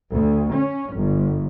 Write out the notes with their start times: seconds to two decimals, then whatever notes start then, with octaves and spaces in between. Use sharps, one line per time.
0.11 D2
0.52 C#4
0.94 G1